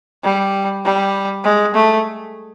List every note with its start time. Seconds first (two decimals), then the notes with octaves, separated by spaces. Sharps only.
0.24 G3
0.85 G3
1.44 G#3
1.74 A3